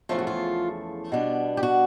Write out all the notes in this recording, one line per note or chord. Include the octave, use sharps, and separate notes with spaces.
E2 C#3 F3 A3 F4
F#4
F4
B2 G3 B3 D4
G4
F#4